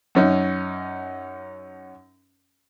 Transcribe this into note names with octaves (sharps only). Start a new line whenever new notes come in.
F#2 C#4 D#4